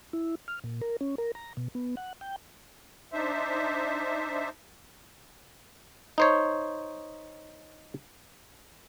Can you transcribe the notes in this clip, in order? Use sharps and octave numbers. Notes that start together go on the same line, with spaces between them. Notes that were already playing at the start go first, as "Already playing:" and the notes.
E4
F6
A#2
A#4
C#4
A#4
A#5
B2
B3
F#5
G5
D4 D#4 C5 E5
D#4 C5 C#5